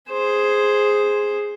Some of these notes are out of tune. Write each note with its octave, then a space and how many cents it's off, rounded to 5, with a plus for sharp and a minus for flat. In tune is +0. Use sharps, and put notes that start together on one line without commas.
G#4 +0 C5 +0